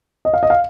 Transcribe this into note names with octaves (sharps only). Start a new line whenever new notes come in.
D#5
F5
D#5
F5